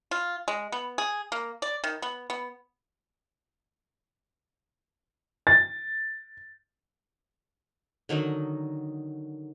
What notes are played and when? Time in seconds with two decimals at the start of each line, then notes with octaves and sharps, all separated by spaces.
0.11 F4
0.48 G#3
0.72 B3
0.98 G#4
1.32 A#3
1.62 D5
1.84 D#3
2.02 B3
2.30 B3
5.47 A6
8.09 D3 D#3 F#3 D#4